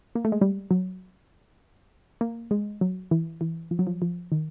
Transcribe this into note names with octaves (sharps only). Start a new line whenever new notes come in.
A#3
A3
G#3
G3
F#3
A#3
G#3
F#3
E3
E3
F3
F#3
F3
F3
D#3